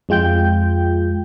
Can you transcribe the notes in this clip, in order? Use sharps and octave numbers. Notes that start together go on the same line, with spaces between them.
F2 G#3 F4 G5 G6